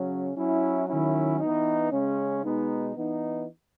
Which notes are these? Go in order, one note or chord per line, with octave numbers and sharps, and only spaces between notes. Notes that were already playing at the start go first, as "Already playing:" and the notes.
Already playing: C#3 F#3 C#4
F#3 C#4 E4
D#3 F#3 C#4 E4
E3 B3 D#4
C#3 G#3 C#4
B2 G#3 B3 D#4
E3 B3 D#4